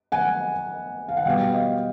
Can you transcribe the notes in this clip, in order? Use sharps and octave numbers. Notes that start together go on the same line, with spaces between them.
F#5 G#5
F5
F#5
B2 G3 B3 F5 G5
D#5 F5